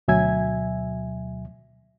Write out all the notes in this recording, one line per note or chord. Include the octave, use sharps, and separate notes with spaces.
D2 B2 F#3 E5 G#5 G#6